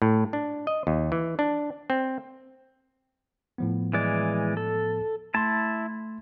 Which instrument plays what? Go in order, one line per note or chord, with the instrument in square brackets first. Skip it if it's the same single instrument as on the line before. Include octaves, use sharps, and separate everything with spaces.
[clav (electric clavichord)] A2
D4
D#5
D#2
E3
D4
C4
[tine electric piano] A2 F3 B3
[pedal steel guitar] E3 G#3 D5
A4
[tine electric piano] A3 C6 [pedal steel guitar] E4 A5